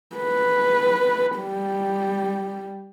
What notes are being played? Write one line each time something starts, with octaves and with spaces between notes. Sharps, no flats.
B4
G3